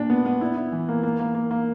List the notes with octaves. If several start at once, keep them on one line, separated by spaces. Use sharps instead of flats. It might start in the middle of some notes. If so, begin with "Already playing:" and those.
Already playing: A#2 D4
B3
B3
E4
E4
E3
A#3
A#3
A#3
A#3
A#3